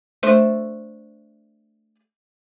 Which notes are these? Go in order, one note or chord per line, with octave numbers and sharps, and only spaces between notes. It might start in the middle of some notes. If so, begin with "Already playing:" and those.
A3 D4 C5